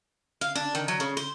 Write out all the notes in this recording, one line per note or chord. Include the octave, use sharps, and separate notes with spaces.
F5
D4
D#3
F#3
C#3
C5